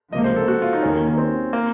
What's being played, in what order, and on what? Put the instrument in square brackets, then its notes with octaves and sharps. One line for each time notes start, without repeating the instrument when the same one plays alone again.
[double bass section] C#2 C3 F3 A#3 [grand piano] D#5
[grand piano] C5
A4
F#4
F4
D#4
[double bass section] D#2 D#3 A#3 [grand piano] C#4
[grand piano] C4
A#3